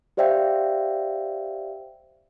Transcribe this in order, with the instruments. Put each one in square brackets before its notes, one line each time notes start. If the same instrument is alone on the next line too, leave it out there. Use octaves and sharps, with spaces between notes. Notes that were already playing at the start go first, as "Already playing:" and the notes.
[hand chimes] G4 C5 D5 E5 F5 G5